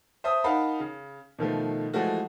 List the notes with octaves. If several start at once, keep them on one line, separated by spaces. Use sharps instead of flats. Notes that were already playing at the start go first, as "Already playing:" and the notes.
C5 E5 A5 D#6
D#4 A#4 F5 F#5 A5 B5
C#3
B2 D#3 F3 A3
E3 F3 G#3 A3 F#4